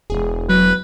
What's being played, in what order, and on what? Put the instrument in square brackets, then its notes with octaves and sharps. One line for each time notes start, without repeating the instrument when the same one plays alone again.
[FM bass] E1 [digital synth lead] G#4
[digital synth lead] F#3 [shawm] B4